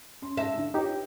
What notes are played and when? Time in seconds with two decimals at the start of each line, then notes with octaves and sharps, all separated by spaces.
0.22 C#4 C6
0.37 G#2 E5 A5 A#6
0.56 D3 D4 E4
0.74 D#4 F4 G4 B4 C#5